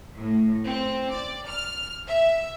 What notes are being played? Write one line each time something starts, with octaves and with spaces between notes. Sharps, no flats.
A2
C4
D5
F6
E5